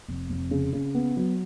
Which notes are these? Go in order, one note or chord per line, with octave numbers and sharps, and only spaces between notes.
F1
F1
C#3
C#3
B3
F#3